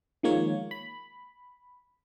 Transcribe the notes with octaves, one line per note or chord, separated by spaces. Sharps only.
D#3 F3 G#3 A#3 F4 C#5
B5